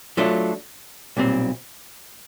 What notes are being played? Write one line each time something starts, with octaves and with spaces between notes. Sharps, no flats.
F#3 A3 D4 F4
B1 A#2 G3 C4